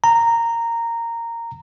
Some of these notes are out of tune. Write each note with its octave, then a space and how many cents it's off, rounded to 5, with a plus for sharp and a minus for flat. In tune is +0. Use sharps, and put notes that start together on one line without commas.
A#5 -10